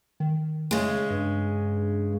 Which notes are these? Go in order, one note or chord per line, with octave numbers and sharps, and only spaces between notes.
D#3
C#3 G#3 A3
G2